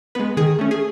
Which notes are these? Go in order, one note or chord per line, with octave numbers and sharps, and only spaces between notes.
G#3 B3 B4
D#3 G#4
A3 C#4
G#4